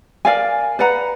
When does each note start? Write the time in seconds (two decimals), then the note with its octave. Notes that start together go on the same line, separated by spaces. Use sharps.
0.25 A#4 D5 F5 G#5
0.79 B4 D5 F#5 A#5